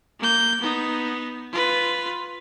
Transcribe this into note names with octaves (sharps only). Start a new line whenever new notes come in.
A#3 G6
B3 D#4
F4 B4